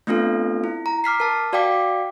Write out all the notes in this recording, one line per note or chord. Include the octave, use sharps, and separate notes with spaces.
A3 B3 C4 D4 F4 A4
E4
A#5
D6 F6 B6 C7
A#4 A5
F#4 D5 F5 G5 D6 B6